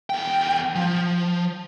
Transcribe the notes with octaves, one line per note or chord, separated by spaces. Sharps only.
E2 G5
F3